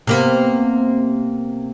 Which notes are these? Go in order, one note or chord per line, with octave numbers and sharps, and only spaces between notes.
C3 A#3 B3